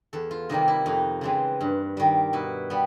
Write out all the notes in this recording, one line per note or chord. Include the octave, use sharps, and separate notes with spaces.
E2 A4
F4
C3 D#3 G3 A#3 D#4
E4
F2 D#4
C#3 E3 G#3 C4
G2
D#3 G3
B2 E4
G3 B3